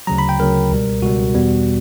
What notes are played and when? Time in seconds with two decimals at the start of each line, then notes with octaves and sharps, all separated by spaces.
0.07 D2 C#3 F#3 A#5
0.18 B5
0.29 G5
0.39 D2 C#3 F#3 A#4
0.71 C#2 B2 G3
1.02 C#2 B2 G3 F#4
1.34 E2 B2 G3 B3